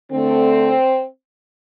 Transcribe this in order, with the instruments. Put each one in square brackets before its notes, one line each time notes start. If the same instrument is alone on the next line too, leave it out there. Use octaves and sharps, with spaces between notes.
[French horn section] D3 A3 C4